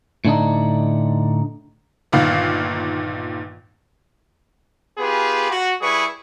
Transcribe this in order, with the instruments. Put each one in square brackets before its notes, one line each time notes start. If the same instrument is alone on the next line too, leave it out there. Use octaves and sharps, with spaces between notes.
[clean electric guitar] A2 D3 D4 D#4
[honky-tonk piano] G1 A#2 D#3 F5
[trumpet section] B3 F4 G4 G#4 B4
F#4
G3 E4 G#4 B4 C#6